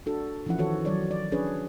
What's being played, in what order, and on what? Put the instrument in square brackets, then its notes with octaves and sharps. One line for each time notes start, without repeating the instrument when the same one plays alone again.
[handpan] D4 F#4 A4
E3 F3 C#4 E4 F#5
D#3 F#4 A4 C#5
D#3 F#3 C#5 D5
D5
C#4 D4 G#4 B4 C#5